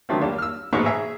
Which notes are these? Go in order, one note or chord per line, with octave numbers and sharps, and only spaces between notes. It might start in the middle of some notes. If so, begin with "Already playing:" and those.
D3 D#3 F#3 A3 C4
G3 A#3 D4
E6 F6
A1 G#2 B2 E3 C#5 C#6
G#4 E5 A#5